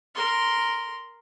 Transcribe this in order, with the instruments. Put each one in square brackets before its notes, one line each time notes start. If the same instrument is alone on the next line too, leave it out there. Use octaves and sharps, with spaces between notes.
[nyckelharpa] A#4 C6